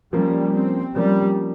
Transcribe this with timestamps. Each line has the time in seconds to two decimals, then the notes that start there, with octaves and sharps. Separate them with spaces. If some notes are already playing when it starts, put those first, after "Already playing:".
0.13 F3 G3 A#3 C#4
0.54 C4
0.95 F3 G3 A#3 C#4